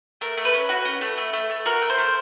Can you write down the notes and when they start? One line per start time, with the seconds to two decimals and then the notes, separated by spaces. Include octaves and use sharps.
0.21 A3 A#4
0.37 A3
0.45 B4
0.54 C#4
0.69 F#4
0.85 C#4
1.01 A3
1.17 A3
1.33 A3
1.50 A3
1.66 F#4 A#4
1.82 A3
1.90 C5
1.98 A3